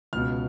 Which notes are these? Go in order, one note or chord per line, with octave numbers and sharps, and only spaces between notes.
C#2 B2 F6